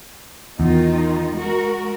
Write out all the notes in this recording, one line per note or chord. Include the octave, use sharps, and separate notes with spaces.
E2 D#3 D#4 F4
G#3 F#4 A#4